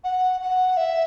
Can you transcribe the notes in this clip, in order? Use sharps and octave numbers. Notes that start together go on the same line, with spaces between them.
F#5
F#5
E5